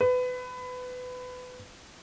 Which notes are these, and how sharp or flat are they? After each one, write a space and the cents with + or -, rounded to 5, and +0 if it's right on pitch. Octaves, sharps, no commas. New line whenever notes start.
B4 +25